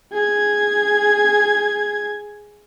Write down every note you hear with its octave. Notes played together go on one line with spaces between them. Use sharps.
G#4 G#6